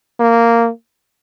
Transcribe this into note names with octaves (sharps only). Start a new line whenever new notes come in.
A#3